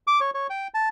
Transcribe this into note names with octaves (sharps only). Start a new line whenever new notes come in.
D6
C#5
C#5
G5
A5